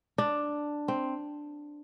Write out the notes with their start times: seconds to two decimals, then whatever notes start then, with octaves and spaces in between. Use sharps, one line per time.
0.18 D4
0.88 C4